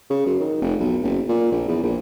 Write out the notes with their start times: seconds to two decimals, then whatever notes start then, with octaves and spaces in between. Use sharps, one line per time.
0.10 C#3
0.26 F#2
0.40 D#3
0.62 F1
0.80 B1
1.03 F#1
1.29 A#2
1.52 A#1
1.68 E2
1.83 A#1